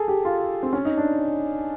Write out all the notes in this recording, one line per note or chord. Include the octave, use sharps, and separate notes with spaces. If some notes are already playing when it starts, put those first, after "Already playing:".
Already playing: G#4 A4
G4
F4
C4
C#4
D#4
D4